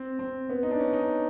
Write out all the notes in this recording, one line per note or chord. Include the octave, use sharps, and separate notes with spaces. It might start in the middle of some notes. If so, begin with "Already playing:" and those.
Already playing: C4
C4
B3
D#4
D4
C#4
D#4